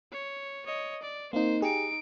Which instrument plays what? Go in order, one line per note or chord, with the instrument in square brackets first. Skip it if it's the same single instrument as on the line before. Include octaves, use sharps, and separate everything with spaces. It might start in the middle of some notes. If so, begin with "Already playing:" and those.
[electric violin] C#5
C#5 D#5
D5
[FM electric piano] A#3 C4 D#4 [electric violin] C5
[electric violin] D#4 D7 [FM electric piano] G4 G#4